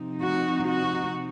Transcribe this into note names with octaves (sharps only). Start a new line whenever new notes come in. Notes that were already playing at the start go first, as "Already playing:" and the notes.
Already playing: C3 F3 C4 D#4
F#4
F#4